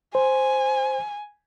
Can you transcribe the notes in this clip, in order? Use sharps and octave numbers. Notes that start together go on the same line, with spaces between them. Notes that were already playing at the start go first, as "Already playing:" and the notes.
C5 G#5